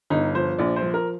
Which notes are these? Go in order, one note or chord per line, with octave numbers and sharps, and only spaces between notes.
G1 D#4
F3 C5
A#1 D5
C5
F3
A#4